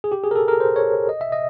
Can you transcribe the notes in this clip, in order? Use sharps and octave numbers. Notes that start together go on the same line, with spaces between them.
G#4
G4
G#4
A#4
A4
A#4
C5
C#5
D#5
E5
D#5